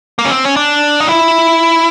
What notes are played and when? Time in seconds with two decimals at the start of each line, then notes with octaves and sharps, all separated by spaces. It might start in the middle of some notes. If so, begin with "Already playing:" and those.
0.19 A#3
0.25 C#4
0.31 C4
0.45 C#4
0.56 D4
1.00 D#4
1.09 E4